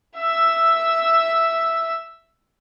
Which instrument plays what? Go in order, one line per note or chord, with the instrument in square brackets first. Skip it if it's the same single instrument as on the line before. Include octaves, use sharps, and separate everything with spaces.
[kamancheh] E5 E6